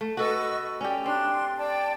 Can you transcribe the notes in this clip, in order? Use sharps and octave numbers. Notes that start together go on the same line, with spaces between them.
A3
F#4 A4 B4 D#5 C#6 E6
C#4 G4 D5
C4 D4 C6
D5 G5 A5